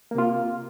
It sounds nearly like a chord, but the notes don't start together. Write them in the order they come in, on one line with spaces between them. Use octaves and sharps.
A#3 C3 F4